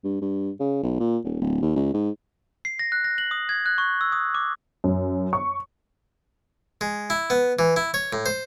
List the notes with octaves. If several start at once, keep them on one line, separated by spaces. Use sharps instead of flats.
G2
G2
C#3
B1
A#2
D#1
D1
D#2
C#2
G#2
C7
A#6
F#6
A#6
F#7
D#6
G#6
F#6
C#6
E6
D#6
D6
F#2
C#6
G#3
E4
B3
E3
E4
C#5
A2
C5